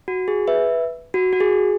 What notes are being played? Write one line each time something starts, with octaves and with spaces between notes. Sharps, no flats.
F#4
G#4
B4 E5
F#4
F#4
G#4